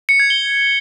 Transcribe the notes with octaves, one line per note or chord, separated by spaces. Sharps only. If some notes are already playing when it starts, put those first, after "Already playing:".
C#7
G#6
G7